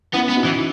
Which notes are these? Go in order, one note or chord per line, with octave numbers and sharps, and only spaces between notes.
B3 C#4 E4
B3
D#4 F#4
E3